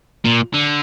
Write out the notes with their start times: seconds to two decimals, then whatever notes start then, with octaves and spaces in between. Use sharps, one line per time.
0.25 A#2
0.54 D3